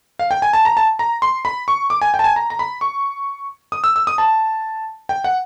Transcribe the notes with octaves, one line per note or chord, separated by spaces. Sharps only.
F5
G5
G#5
A5
A#5
A5
A#5
C6
B5
C#6
D6
G#5
G5
A5
G#5
A#5
A#5
B5
C#6
D#6
E6
E6
D#6
A5
G5
F#5